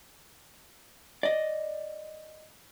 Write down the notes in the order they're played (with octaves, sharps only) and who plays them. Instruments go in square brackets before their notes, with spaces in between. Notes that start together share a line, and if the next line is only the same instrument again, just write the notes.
[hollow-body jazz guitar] D5 D#5